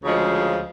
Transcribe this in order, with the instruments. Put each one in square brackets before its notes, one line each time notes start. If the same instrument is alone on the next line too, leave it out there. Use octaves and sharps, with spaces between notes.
[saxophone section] D2 C#3 F3 G#3